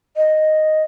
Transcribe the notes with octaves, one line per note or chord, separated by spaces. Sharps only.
D#5